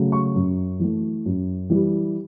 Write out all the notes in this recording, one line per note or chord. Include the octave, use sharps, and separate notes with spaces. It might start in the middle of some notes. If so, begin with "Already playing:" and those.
Already playing: C#3 F#3 A3
C#6
F#2
E3 A3
F#2
E3 G3